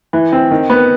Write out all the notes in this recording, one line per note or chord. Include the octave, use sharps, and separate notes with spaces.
E3
C4
D#3
B3